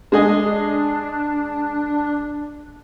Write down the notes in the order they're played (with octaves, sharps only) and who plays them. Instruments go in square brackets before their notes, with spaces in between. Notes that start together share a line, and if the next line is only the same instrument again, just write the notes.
[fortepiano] G#3 G#4 D#5 [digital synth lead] D4